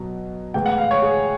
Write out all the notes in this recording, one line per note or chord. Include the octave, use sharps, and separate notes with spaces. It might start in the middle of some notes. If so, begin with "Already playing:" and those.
Already playing: B2 F#3
A2 E3 G#3 G5
F#5
F5
C#5
G#4